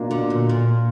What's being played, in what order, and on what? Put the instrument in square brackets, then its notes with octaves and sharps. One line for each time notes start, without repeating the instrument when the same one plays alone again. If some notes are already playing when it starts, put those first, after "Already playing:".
Already playing: [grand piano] B2 A#3 D4 F4
[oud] D3
A#2
A#2